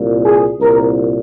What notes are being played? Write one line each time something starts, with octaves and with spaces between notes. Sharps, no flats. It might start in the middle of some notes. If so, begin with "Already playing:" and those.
Already playing: C2 A#2
G#4
C2 A#2 A#4